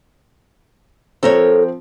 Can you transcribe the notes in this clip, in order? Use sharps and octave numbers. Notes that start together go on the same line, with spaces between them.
F3 C4 A4 A#4 C#5